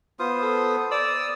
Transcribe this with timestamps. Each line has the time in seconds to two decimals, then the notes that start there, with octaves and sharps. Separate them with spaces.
0.19 B3 F4 C5 D#6
0.42 A4
0.91 D5 D#6 E6